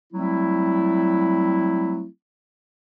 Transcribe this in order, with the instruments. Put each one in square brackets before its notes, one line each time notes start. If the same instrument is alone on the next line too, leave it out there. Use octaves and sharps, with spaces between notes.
[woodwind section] F#3 G3 A3 C4 E4